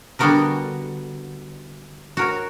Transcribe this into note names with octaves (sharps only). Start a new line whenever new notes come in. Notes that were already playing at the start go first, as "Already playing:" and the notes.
D3 G3 B3 F#4 A#4 B4
F#4 A#4 C#5